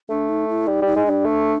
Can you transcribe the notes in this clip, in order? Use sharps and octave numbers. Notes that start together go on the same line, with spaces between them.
A3 D4
D#4
E4
G3 D#4
G3 D#4
G#3
G3 D4
A3